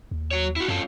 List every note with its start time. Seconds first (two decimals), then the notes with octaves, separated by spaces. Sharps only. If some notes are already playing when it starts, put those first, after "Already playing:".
0.11 D#2
0.31 F#3 C#5
0.56 E4 F#4
0.68 F#2 C#4 F4 A4